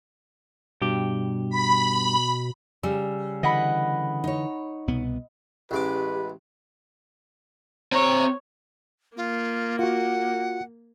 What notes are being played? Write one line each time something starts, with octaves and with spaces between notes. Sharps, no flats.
G2 B2 G4
B5
C#3 G3 E6
D3 E3 D#5 F#5 B5
D#4 C#5
C2 B2 B3
A1 G#3 G4 B4 D6
C4 C#5 A#5
A#3 F4
F4 F#4 F#5